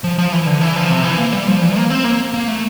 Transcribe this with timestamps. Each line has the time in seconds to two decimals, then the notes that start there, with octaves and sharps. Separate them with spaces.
0.04 F3
0.18 F3
0.32 E3
0.46 D3
0.61 E3
0.76 F3
0.90 C3
1.04 E3
1.18 A#3
1.33 G3
1.48 F3
1.62 E3
1.77 A#3
1.90 C4
2.04 A#3
2.34 A#3
2.48 A3